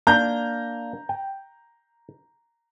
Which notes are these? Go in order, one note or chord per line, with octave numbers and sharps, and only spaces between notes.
A#3 D4 A#5 G6
G5